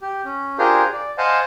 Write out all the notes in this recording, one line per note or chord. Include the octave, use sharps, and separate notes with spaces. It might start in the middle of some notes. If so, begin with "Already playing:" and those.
G4
C#4
D4 F4 G4 G#4 A#4 C5
D5
C5 D#5 F5 F#5 G#5 A5